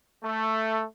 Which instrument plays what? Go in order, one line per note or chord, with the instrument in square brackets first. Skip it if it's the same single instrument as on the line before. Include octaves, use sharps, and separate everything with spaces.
[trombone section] A3